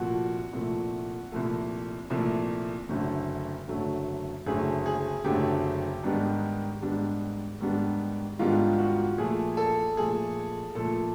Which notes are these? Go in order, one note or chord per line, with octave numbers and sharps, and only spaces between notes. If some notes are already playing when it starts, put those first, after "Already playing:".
Already playing: C2 A#2 F3 A3 F#4
C2 A#2 F3 A3
C2 A#2 F3 A3
C2 A#2 F3 A3
F#1 F#2 D3 F#3 A3
F#1 F#2 D3 F#3 A3
F#1 F#2 D3 F#3 A3 G#4
G#4
F#1 F#2 D3 F#3 A3 G4
G#2 D#3 G3 B3 D4
G#2 D#3 G3 B3 D4
G#2 D#3 G3 B3 D4
G#2 D#3 G3 B3 D4 F4
F#4
A#2 F3 A3 G#4
A4
A#2 F3 A3 G#4
A#2 F3 A3 A4